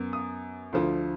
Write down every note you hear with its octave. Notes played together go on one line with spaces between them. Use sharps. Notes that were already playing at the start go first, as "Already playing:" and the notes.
Already playing: F#2 B3
D#6
D2 D3 F3